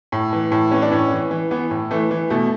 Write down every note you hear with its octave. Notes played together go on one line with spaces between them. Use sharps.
A2
E3
A2
E3 C#4
D4
A2 C#4
E3
E3
E3 B3
A2
E3 A3
E3
B2 A3